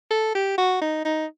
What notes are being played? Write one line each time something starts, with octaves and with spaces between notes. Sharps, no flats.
A4
G4
F#4
D#4
D#4